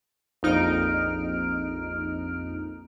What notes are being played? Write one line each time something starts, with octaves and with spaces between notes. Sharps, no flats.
A#1 F2 D#4 F6 D7